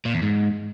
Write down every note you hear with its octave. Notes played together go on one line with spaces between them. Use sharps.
A#2
E2
G#2